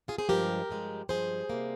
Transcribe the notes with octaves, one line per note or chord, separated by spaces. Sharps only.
F4 G#4
G#4 C5
G2 F3 G#3 G4 A#4
G2 F3 G#3
G2 F3 G#3 G#4 C5
C3 G3 A#3